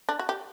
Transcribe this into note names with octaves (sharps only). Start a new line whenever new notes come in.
D4
F#4
G4